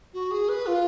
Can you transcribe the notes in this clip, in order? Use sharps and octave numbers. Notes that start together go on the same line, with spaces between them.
F#4
G#4
B4
F4